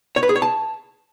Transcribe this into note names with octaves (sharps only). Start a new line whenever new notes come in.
C#5
B4
G#4
C#5
A5